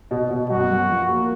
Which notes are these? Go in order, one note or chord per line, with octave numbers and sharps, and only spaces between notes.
B2
B2
F#2 F#4
F#2
F3
A#3